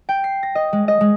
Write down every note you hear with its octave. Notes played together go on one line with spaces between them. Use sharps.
G5
C7
A#6
D#5
G#3
D#5
G#3